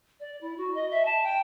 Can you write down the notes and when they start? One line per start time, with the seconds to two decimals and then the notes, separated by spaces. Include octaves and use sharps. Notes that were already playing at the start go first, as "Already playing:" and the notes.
0.20 D5
0.41 E4
0.57 F#4
0.74 D#5
0.91 E5
1.05 A5
1.23 G5